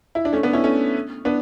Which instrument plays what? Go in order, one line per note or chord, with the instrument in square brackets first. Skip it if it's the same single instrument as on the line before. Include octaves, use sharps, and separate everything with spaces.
[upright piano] E4
D4
A3 C#4
B3 D4
C#4 E4
A3 C#4
B3 D4